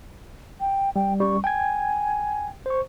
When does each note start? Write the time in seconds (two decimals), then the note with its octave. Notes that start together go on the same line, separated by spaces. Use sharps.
0.61 G5
0.96 G3 G5
1.20 G3 C#4 C#6
1.44 G5 G#5 G#6
2.66 C5 C#6